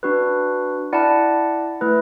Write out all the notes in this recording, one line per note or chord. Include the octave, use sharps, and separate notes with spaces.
D4 F#4 B4
E4 D5 F#5 A5
A3 E4 B4